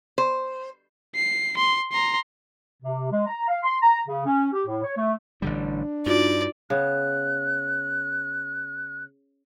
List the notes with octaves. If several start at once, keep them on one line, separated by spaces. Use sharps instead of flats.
C5
C7
C6
A#5 C6
C3
G#3
A#5
F5
C6
A#5
C#3
C#4
G4
A2
C#5
A3
A1 D3 G3 D4
G2 D#4 F4 F#4 D5
C#3 B3 F#6